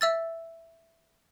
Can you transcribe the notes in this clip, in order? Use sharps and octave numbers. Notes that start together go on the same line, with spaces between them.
E5 E6 A6